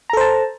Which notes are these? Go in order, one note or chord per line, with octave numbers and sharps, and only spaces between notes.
A4 C5 A5 A#5